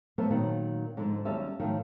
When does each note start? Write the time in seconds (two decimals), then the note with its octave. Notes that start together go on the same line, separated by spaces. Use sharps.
0.18 F#3 A3 B3 A#4 C5 C#5
0.30 A#2 D#3 F#3 B3
0.97 G#2 D3 F3
1.25 D#2 F#3 G3 C#4 E5 A5
1.60 A2 D#3 F3 F#3